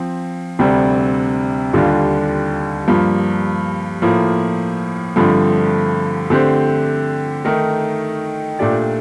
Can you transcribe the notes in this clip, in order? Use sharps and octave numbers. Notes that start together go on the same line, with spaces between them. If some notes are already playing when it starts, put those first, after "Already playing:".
Already playing: F3 C4
D2 C3 G3 D4
D#2 D3 G3 D4 F4
G2 F3 A#3
A2 F3 A#3
G2 D3 F3 A3 C4
D3 A3 C4 G4 C5
D#3 A3 D#4 A#4
A#2 A3 D4 G4 D5